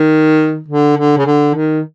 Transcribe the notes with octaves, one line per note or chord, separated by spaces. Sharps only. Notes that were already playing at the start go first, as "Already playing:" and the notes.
Already playing: D#3
D3
D3
C#3
D3
D#3